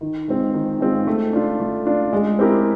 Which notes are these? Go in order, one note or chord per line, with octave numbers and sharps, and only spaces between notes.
D#3
G#3 C4 F4
D#3
G#3 C4 F4
A3
D4 F4
A3
D4 F4
G#3
C4 E4 G4 A#4